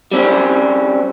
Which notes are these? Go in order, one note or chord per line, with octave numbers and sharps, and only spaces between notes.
G3 C4 C#4